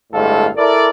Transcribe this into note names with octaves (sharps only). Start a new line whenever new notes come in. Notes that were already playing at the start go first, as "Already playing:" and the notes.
G1 A2 G#3 A4 F5
E4 A4 A#4 D5